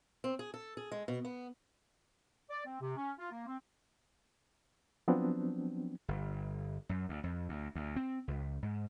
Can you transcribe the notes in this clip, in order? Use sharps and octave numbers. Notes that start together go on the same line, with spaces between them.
C4
G#4
A4
G#4
G#3
B2
B3
D5
C4
C3
C#4
F4
A#3
C4
F3 F#3 B3 C4 D4
G1
F#2
D2
F2
D2
D2
C4
C#2
G#2